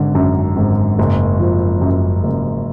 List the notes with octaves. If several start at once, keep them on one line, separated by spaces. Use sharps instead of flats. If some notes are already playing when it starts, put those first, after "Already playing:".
Already playing: G#1 D3
F#2
G#1
F#1
F3
F#2
F#1